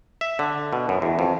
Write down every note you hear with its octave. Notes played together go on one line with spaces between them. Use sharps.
E5
D3
B2
F#2
E2
F2